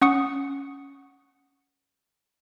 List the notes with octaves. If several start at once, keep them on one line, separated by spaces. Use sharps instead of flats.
C#4 F#5 C#6 D#6 C#7